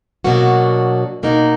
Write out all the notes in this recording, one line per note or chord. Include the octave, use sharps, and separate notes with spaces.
B2 F#3 A#3 D4 F#4
B2 A#3 D#4